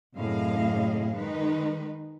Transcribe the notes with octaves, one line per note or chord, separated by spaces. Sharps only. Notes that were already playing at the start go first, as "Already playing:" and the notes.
F#2 A2 C3 G#4 D#5 F5
D#3 G#3 D#4 B4